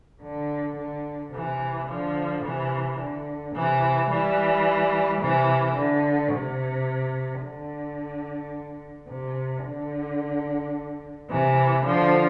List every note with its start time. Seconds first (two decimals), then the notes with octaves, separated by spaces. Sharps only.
0.23 D3
0.78 D3
1.34 C3 E3
1.89 D3 F3
2.44 C3 E3
3.00 D3
3.56 C3 E3
4.10 E3 G3
5.21 C3 E3
5.77 D3
6.32 C3
7.42 D3
9.09 C3
9.65 D3
11.31 C3 E3
11.86 D3 F3